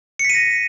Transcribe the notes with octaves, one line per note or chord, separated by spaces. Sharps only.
C#7
B6
D#7
A#6